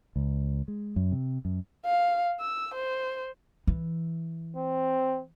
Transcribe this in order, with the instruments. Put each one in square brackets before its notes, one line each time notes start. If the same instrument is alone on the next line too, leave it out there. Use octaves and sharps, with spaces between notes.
[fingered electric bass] C#2
G#3
F#2
C3
F#2
[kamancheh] F5
E6
C5
[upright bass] E3
[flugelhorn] C4